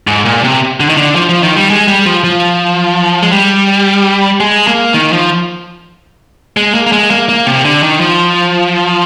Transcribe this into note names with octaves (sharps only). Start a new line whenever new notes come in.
G#2
A#2
C3
D3
D#3
D3
F3
F3
D#3
G3
G#3
G3
F3
F3
G#3
G3
G#3
A#3
D#3
F3
G#3
A#3
A#3
G#3
A#3
A#3
C3
D3
D#3
F3